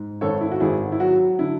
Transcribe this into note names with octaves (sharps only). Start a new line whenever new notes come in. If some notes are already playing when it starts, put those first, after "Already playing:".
Already playing: G#2
G#1 A4 C#5
E4
F#4
G#1 E4 G#4
E4
F#3 F#4
D3 E4